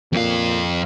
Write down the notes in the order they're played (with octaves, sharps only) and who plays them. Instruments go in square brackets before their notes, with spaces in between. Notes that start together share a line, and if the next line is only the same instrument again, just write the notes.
[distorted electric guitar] F2 F5 [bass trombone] A#2